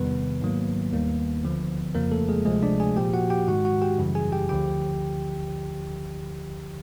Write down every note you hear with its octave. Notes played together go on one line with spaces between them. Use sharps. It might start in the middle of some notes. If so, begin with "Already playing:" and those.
Already playing: E2 C3 D#3 G3 B3 B4
G#2 D#3 F#3 A#3
D#2 D#3 G3 A#3
D2 D3 F3
F2 C#3 F3 A#3 A#4
A3 A4
G#3 G#4
D2 C3 F3 G#3 A3 G#4
D4 D5
G#4 G#5
A#2 F3 A#3 G4 G5
F#4 F#5
G4 G5
G#2 D#3 G#3 F#4 F#5
F#4 F#5
G4 G5
F#2 C#3 E3 G3
G#4 G#5
G4 G5
D2 D3 F3 G4 G5